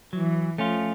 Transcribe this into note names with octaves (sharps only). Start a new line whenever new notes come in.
E3 F#3
F3 A3 C#4 F4